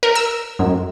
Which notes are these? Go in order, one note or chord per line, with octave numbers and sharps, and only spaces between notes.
A#4
E6
F#2